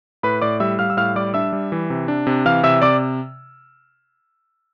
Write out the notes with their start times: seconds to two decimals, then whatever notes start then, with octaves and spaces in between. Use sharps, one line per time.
0.23 A2 B4 B5
0.42 A2 D5 D6
0.60 G3 E5 E6
0.79 G3 F5 F6
0.90 E6
0.97 A2 F5 F6
1.16 G3 D5 D6
1.34 D4 E5 E6
1.53 G3
1.72 E3
1.90 C3
2.08 D4
2.27 C3
2.46 E3 F5 F6
2.63 C3 E5 E6
2.82 C3 D5 D6